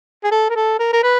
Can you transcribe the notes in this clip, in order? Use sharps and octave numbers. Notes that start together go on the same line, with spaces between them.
G#4
A4
A#4
A4
A#4
A#4
B4